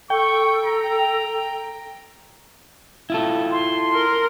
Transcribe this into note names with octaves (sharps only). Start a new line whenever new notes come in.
A4 G5 C#6
A#5
E4 F4 A4
C6
A#4